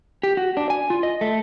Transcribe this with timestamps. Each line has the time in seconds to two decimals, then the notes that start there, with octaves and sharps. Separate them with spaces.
0.23 G4
0.37 F#4
0.57 D4
0.70 G#5
0.90 F4
1.03 D#5
1.21 A3